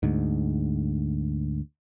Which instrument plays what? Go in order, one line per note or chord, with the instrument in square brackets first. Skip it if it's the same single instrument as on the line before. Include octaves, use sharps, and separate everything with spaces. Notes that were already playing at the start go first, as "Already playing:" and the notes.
[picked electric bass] D2 G#2